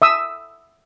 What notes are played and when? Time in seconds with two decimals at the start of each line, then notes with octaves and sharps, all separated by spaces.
0.02 E5 D#6 E6